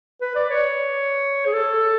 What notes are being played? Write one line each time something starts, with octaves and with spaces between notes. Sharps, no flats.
B4
D5
C#5
G#4
A4